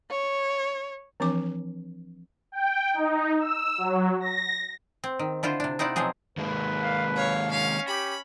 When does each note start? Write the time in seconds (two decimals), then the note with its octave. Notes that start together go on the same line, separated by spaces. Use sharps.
0.10 C#5
1.20 E3 F3 C4 D4 C#5 D6
2.52 G5
2.94 D#4
3.39 E6
3.78 F#3
4.20 A#6
5.04 C4
5.19 D#3
5.43 D3 E4 F4 C5
5.60 C3 D4
5.79 C4 D#4 E4 D5 F#5
5.96 B2 F3 F#3 C4 G#4
6.37 D#3 G#3 A#3 B4
6.82 F5
7.16 C#5 F5
7.51 C#4 F5
7.88 G4 B5